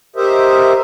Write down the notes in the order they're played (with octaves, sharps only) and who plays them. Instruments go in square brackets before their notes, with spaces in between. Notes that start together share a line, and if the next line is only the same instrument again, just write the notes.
[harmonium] G4 A#4 C5 D#5 E5